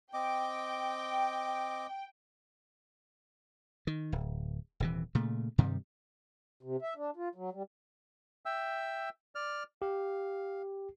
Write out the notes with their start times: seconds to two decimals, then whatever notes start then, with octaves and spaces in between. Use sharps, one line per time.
0.13 C4 D#5 G5 D6
3.87 D#3
4.12 D1
4.80 D#1 C3 E3
5.15 A#2 C#3 A3
5.58 G2 C3 D#3 G3
6.63 C3
6.82 E5
6.96 D4
7.17 F4
7.35 F#3
7.52 G3
8.46 E5 G5 E6
9.35 D5 F6
9.82 G4 F5